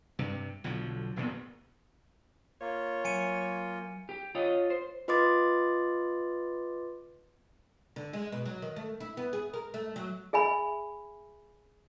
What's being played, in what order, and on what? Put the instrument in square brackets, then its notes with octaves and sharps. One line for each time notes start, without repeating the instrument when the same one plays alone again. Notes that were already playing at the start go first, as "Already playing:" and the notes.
[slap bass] G2 C3
B1 D3 F3 F#3
E1 D2 A#2 B3
[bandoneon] A#3 F4 [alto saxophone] C#5
[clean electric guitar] F#3 E5 [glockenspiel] G#5 C#7 D#7
[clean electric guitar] G4
F4 C#5 D#5
C5
[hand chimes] F4 B4 D#5 C6 D6 A6
[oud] D3
G#3
B2
F#3
D#3
A3
E4
B3
G#4
A#4
A3
F#3
[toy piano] G#4 E5 G#5 B5